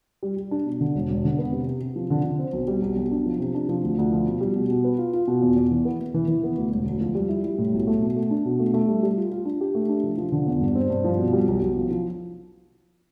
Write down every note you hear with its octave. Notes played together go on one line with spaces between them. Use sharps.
G3
G3
D4
B2
D3
E1
E1
D3
B3
C3
C3
C3
F3
D3
D3
C4
B1
G3
B1
B1
D4
F3
C3
D4
F3
D2
D2
F3
B2
G3
B2
B2
B4
F4
F4
B2
E2
E2
E3
B3
B3
E3
E3
B3
D2
E1
D2
F3
G3
E4
G3
A2
B1
A3
B2
A3
D4
B2
A3
A3
G3
G3
F4
F4
D4
G4
A3
D4
F3
F3
D3
E2
G2
C4
G2
F3
B2
G3
B1
B1
F3
F3